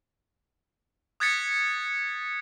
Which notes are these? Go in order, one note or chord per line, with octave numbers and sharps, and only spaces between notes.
D#6 F#6 G#6 A6 B6 C#7